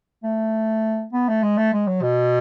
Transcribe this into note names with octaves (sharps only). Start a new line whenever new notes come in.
A3
B3
A3
G#3
A3
G#3
F#3
B2